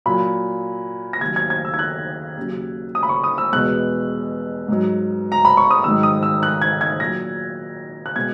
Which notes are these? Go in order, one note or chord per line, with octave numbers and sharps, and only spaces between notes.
A#2 F#3 B5
A#6
D#2 D#3 F#3 G#6
G#6
G#6
E6
G#6
F#6
D#2 C#3 F#3
D#6
B5
C#6
D#6
E6
E2 B2 G#3 F#6
G#2 F#3
A#5
B5
C#6
D#6
G#2 D#3 F#3 E6
D#6
E6
F#6
G#6
G#6
A#2 F#3 A#6
F#6
B2 G#3 G#6